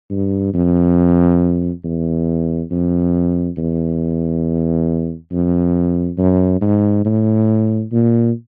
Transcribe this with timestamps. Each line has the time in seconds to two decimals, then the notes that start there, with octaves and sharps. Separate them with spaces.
0.10 G2
0.54 F2
1.84 E2
2.71 F2
3.57 E2
5.32 F2
6.18 F#2
6.61 G#2
7.05 A2
7.92 A#2